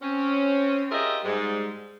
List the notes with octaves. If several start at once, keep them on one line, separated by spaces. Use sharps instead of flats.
C4 C#4
F4 G4 G#4 A#4 D#5 E5
G#2 G3 G#3